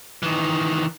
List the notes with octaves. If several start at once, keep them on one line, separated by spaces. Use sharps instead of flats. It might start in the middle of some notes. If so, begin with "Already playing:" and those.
D#3 E3